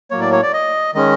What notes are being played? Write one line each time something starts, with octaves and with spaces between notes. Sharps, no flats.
A2 F#3 A#3 C#5
D5
C#5
D5
D#5
D#3 G#3 C#4 D#5